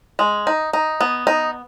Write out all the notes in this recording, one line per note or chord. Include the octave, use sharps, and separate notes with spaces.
G#3
D#4
D#4
B3
D#4